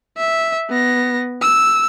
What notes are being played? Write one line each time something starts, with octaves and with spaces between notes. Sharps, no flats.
E5
B3 A#6
E6